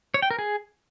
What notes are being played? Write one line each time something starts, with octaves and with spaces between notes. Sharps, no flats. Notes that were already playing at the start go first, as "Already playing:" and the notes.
C#5
G5
A#4
G#4